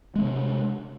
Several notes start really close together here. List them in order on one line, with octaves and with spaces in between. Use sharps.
G#3 C4 C3 D4